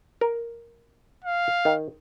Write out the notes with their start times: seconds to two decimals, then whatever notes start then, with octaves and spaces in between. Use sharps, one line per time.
0.21 A#4
1.24 F5
1.65 D#3